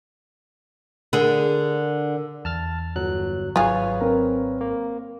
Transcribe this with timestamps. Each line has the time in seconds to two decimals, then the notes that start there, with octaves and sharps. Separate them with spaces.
1.13 D3 G#4 A#4
2.45 E2 A5 F6 A6
2.96 G1 F#3 F#6
3.56 G#1 F#3 F4 G#4 B4 C#5 F5
4.00 C4 A#4
4.61 A#3